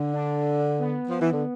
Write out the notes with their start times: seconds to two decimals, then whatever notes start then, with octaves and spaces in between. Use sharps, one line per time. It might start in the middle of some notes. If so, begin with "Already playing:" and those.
Already playing: D3
0.13 D4
0.79 B3
1.09 F3
1.20 E3
1.32 D3